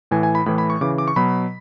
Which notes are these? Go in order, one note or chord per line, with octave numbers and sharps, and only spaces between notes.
A2 E3 G#5
G#5
B5
A2 E3 B5
B5
C#6
C#3 E3 D6
D6
C#6
B2 F#3 B5